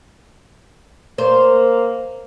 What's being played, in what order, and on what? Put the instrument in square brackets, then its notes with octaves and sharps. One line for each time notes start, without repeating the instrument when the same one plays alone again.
[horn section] A#3 [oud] C5